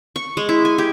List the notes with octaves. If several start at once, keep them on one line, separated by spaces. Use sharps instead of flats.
C#6
G#3
E4
G#5
G4